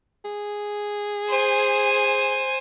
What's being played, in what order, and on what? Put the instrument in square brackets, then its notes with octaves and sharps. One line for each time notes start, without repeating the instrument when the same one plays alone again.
[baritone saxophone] G#4
[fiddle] C5 G#5